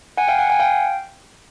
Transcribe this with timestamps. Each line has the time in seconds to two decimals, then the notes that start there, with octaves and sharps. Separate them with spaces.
0.17 F#5 G#5
0.28 F5 G5
0.39 F#5 G#5
0.50 F#5 G#5
0.60 F5 G5